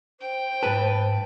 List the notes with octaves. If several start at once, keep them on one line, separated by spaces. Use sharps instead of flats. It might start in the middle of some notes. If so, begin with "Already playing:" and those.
C5 G5
G#2 B4 A5